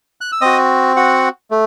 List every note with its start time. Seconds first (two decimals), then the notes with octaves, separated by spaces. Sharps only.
0.21 F#6
0.32 E6
0.41 C4 F#4 D#5 D#6
0.96 F#4 F#5
1.51 A3